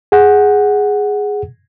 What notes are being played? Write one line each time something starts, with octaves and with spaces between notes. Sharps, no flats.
G#4 F#5